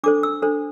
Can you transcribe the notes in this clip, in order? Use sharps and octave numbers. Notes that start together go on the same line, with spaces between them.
D4 A4 C5 D6
E6
D4 A4 C5